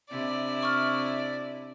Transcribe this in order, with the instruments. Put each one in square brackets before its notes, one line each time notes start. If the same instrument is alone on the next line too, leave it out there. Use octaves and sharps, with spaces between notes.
[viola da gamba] C3 D4 E4 [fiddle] D5
[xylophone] C#6 F6